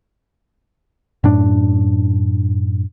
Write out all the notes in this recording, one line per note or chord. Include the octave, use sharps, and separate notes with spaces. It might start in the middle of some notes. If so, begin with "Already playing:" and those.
F#2 A2 D4